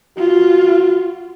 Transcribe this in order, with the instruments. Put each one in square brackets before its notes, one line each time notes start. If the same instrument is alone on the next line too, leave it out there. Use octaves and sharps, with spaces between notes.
[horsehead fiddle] F4 [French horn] F#4